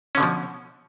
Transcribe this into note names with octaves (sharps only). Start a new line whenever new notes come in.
B2 D3 F3 C#4